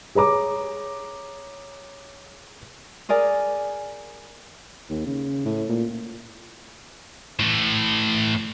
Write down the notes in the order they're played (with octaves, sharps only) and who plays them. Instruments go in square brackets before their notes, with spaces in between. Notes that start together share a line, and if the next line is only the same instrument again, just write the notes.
[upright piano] G#4 C#5 A#5 D6
[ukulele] G#4 A#4 D5 G#5
[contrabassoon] D#2
C#3
A2
A#2
[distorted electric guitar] A2 E3